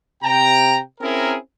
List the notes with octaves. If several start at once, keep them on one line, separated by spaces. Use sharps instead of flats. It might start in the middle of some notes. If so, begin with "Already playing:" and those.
C3 G5 A#5
C4 C#4 E4 G#4 A#4